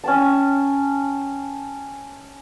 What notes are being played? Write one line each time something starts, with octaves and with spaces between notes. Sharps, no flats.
C#4 G5 A5